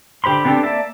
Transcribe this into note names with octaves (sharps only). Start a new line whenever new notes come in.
D3 G4 C5 B5 C6
B3 C4 D4 G4 A4
A#3 D5 E5 A5